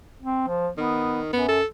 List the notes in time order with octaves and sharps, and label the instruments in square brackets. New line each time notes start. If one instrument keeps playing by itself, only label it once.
[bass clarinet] C4
F3
[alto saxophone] D#3 [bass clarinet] B3
[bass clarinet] F#2 [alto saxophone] B3
[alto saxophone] A4